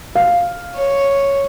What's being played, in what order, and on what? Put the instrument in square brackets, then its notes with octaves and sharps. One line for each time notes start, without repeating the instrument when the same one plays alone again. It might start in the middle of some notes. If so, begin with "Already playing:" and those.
[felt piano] F5
[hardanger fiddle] C#5